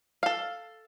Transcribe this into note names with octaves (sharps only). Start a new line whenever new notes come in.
A4 F5